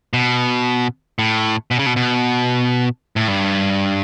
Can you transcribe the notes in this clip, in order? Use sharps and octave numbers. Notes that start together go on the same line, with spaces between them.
B2
A2
B2
C#3
B2
B2
A2
G2